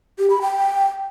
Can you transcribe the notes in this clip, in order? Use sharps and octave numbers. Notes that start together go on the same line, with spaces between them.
G4
B5
G5